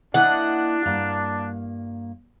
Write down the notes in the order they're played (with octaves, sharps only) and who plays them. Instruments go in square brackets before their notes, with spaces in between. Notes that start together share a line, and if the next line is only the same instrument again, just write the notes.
[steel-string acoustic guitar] A#3 E4 D#5 [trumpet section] D4 [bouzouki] F#5
[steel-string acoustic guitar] G2 A#3 F5